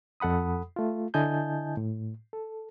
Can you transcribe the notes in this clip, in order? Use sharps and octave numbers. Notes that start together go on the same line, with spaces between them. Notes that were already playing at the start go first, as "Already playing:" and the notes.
F2 A4 F#5 B5 D#6
A3 F4
D3 E4 D#5 G#5 A5 G6
A2
A4